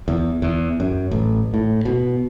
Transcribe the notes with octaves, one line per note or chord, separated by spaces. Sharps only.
E2
E2
F#2
A1
A2
B2